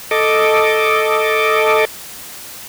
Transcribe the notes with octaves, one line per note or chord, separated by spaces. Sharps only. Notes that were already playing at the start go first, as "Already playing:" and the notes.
A4 D#5 D6